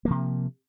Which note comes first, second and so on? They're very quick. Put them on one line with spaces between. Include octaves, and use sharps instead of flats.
A#3 F3 C3